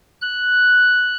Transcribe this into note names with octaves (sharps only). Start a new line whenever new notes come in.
F#6